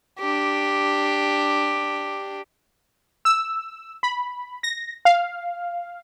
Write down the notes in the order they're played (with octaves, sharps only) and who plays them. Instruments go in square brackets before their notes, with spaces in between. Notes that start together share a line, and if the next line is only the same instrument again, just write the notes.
[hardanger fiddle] D4 G4
[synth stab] E6
B5
A#6
F5